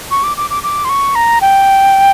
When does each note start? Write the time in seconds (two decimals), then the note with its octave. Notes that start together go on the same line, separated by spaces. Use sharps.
0.11 C#6
0.24 D6
0.37 D6
0.50 D6
0.63 D6
0.85 C6
0.89 C#6
1.15 A#5
1.41 G5